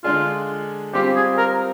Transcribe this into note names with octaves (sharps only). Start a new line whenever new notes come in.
D3 G#3 D4 F4 G#4
G3 C4 F4 G4
G#4
A#4